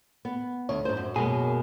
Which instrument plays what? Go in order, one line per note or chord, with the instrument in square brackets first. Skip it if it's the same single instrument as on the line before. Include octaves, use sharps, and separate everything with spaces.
[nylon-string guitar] B3
[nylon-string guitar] D2 [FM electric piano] C#5
[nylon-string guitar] G#2 C5
F#2
[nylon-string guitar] F#2 B2 [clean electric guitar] G#3 A#3 G#4